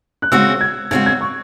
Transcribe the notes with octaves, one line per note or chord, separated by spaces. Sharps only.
F#6
C#3 G#3 C4 F#4 E6
G#6
C#3 G#3 C4 F#4 G#6
G#6
C#6